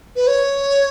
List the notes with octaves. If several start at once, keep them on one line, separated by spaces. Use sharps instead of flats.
B4
C#5